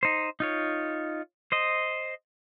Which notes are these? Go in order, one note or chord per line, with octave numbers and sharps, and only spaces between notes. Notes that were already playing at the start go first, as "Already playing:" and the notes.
D#4 C5
D#4 F4 C#5
C5 D#5